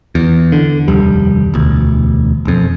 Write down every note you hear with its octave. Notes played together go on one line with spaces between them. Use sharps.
E2
D3
F1 D#2 G3
E1 D2
E1 F2